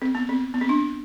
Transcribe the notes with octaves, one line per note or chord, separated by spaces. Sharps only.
C4
B3
C4
B3
C4
D4